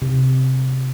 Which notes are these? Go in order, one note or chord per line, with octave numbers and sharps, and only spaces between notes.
C3